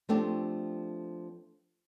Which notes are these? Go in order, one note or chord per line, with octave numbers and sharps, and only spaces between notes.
F3 A3 C4 D4 G4